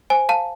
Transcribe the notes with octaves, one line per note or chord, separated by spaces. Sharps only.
C5 G#5
F5 A5